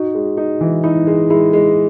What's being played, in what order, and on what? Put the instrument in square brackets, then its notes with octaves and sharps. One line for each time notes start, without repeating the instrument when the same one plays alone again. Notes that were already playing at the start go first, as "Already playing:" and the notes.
Already playing: [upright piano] D#4 [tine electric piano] F#4
[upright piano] G#3
D#4
E3
[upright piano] D#4 [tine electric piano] E4
[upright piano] G#3
[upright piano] G#3 [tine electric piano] E4
[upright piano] G#3